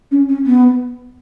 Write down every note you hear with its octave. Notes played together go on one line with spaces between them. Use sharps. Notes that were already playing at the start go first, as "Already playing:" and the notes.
C#4
C#4
B3